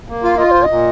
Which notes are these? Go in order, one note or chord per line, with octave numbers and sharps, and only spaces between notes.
A#3
F4 F5
F4 D#5
A#2 C5
A#2 D#5